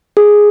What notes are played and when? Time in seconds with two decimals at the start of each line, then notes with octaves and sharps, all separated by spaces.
0.17 G#4